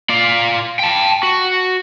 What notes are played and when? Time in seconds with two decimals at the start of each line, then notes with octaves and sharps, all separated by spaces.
0.10 F4 D5
0.79 G5 A5
1.23 F#4